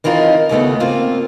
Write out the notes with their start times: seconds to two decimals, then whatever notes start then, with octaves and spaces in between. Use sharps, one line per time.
0.04 D#3 E3 C4 D#4 F4 A#4
0.49 D#2 G#2 C#3 A3 B3
0.80 A#3 C4 F4